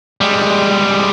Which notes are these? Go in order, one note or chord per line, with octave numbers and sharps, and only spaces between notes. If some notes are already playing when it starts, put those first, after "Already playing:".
G3 G#3